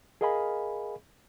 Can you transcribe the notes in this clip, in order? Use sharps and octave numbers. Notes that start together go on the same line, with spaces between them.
G#4 A#4 D#5 F5 G#5 B5